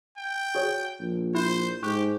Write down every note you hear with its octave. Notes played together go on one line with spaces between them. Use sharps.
G5
F#4 G#4 C#5
A#1
E4 C5
G#2 G4 C#6 F#6